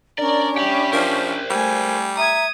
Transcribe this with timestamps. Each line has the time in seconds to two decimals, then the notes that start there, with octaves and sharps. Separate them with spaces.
0.19 C#4 D4 A#4 D5
0.58 G4 E5 G5 B5
0.93 F3 A#4 C5
1.50 G3 A3 G#5
2.17 E5 A#5 D#6 G#6